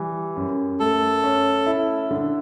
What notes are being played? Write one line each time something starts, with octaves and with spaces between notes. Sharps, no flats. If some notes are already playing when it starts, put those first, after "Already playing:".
Already playing: E3 G3
F#2
A3 A4
C#4
E4
D3